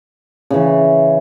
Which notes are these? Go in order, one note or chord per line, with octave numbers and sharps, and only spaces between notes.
C#3 E3